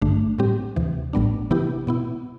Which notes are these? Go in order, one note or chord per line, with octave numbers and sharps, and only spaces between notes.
A1 G2 D3 A3 D4
A2 G3 C4 G4
D2 C3 E3
A1 A2 G3 B3 D4
C3 E3 B3 E4 G4
B2 B3 E4